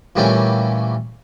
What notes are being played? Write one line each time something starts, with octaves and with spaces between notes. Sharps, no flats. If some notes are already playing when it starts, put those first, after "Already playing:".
A#2 E3 G3 A3 C4 C#4